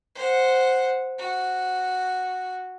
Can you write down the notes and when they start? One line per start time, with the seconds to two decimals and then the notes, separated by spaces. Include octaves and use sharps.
0.15 C5 F#5
1.18 F#4